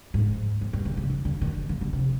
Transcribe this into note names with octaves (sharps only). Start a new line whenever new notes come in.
G#2
F2
G2
D3
C3
D3
D3
D#3
D3
D3
C3